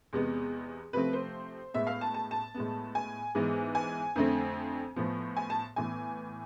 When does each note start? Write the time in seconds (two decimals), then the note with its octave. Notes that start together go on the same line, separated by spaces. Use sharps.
0.13 E2 C3 G#3 B3
0.93 C3 F3 A3 C4 B4
1.13 C5
1.74 A2 G#3 B3 E5
1.87 F5
2.01 A5
2.14 A5
2.31 A5
2.54 A2 G#3 B3
2.95 G#5
3.35 G#2 E3 G#3 B3
3.75 G#5
4.16 F2 D3 A3 C4
4.96 A2 F3 B3
5.37 G#5
5.50 A5
5.76 A2 E3 B3 G#5